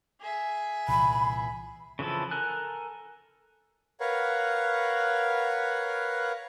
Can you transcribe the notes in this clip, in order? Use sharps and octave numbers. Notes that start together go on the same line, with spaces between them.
G#4 E5
C2 A#2 E3 B5
C#3 E3 F3 E4 A4
A4 A#4 G#5 F#6
A#4 B4 C#5 F5 F#5